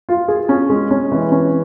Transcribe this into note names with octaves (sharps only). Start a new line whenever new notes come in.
F4
G#4
C#4
G#3
C#4
E3
C#4